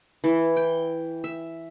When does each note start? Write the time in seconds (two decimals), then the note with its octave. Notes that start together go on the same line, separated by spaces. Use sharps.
0.24 E3
0.56 G5
1.24 E5